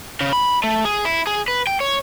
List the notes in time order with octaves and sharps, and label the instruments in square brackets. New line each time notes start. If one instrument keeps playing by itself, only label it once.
[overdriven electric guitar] C#3
B5
A3
G#4
E4
G#4
B4
G5
C#5